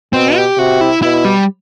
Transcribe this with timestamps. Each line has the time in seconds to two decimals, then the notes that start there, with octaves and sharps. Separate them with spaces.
0.13 B2 C4
0.36 G4
0.58 C3 F#4
0.81 E4
1.02 B2 E4
1.25 G3